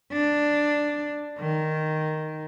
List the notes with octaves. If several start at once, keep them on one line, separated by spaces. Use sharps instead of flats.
D4
D#3